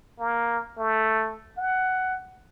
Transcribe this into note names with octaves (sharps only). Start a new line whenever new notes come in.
A#3
A3
F#5